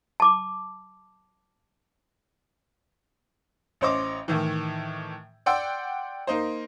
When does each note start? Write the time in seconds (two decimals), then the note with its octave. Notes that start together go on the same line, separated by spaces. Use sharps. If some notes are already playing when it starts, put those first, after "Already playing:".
0.20 A5 D6
3.81 A1 C#4 C5 D#5 D6
4.28 A2 D#3 E3
5.46 D5 F#5 G5 C6 E6
6.27 A#3 D#4 C5